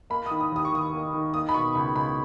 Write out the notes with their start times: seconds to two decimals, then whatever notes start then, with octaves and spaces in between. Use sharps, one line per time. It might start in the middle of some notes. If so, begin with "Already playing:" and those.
0.10 A#3 B5
0.26 D#3 D#6
0.40 D#6
0.52 D#2 D#6
0.65 C#6
0.73 D#2 D#6
0.93 A#3
1.14 D#3
1.34 A#3 D#6
1.49 B5
1.54 B2 C#6
1.75 C#2 B5
1.96 C#2 B5